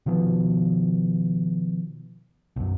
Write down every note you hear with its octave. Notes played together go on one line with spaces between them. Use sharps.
B2 D#3 F3 B3
B1 F#2